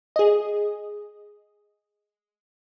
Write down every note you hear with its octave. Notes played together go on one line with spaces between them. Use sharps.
G#4 D#5